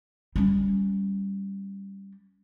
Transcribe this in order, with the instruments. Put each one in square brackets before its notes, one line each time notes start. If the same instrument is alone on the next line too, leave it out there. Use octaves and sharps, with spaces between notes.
[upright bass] G3 C#4